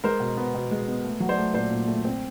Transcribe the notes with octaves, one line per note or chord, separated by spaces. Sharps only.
G#3 A#4 C5
B2
B3
B2
G#3
B3
A3
F#3
C5 D5
A3
A#2 C5 D5
A#2
A3
C4